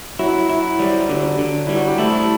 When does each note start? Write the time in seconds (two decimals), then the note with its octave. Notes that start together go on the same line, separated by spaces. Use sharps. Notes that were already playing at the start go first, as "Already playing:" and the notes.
0.19 F#3 E4 F#4
0.49 E4
0.79 G3
1.09 D3
1.38 D3
1.67 G3 E4
1.77 F#4
1.88 G4
1.98 A3 E4 A4